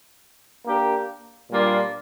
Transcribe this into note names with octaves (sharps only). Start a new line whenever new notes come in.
A#3 D4 G4 A#4
A#2 G3 A#3 D4 F4